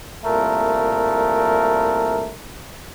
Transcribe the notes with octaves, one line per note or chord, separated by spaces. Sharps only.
C2 A#2 A3 A#4